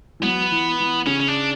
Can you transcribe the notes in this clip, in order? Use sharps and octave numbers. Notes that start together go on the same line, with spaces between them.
E3
F#3 B3
E3
E3
C#3 C#4
C#4
D4